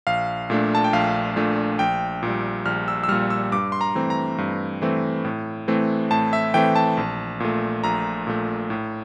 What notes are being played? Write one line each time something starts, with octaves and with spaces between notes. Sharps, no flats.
A#1 F5
A#2 A3 D4
A5
G5
A#1 F5
A#2 A3 D4
A#1 G5
A#2 G3
A#1 F6
E6
E6
A#2 G3 F6
E6
G2 D6
C6
A#5
E3 A3 C4
A#5
G2
E3 A3 C4
A2
E3 A3 C4
A2 A5
E5
E3 A3 C4 G5
A5
A#1
A#2 A3
A#1 A#5
A#2 A3
A2